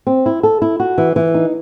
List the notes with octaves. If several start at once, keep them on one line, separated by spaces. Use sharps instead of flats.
C4
E4
A4
E4
F#4
E3
E3
D#4